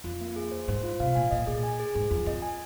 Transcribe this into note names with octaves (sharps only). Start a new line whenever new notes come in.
F2 F4
A#3
G#4
C5
G#2 C5
F4
C3 F5
A#2 G#5
A#2 D#5
A#2 G#4
G#5
G#4
G#2 G#4
F2 F4
F2 D#5
G#5